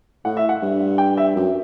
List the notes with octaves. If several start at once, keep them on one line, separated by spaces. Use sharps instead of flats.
A2 F#5
E5
F#5
G2
G5
E5
F#2